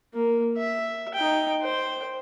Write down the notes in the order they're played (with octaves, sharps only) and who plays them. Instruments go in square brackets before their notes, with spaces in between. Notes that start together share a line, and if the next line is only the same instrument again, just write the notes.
[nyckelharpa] A#3
E5
D#4 G5
C5 G5